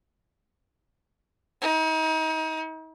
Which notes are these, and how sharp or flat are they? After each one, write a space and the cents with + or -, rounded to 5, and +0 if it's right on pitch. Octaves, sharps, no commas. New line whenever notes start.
D#4 +35